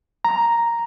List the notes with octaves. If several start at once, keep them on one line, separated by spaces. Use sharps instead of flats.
A#5